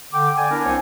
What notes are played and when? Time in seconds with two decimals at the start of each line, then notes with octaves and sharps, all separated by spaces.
0.13 D3 G5 D6
0.37 D5 G#5
0.51 B3 D4 E4 A#4
0.64 C2 B3 C4 C5 C#5 G#5